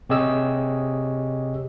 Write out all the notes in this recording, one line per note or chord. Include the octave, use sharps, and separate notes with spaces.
C3 G4 G#4 C#5 D#5 E6